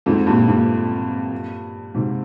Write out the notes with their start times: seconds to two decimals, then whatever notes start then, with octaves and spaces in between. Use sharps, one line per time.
0.06 F2 G#2
0.27 G2 A#2
0.48 G2 A#2
1.95 G#2 C3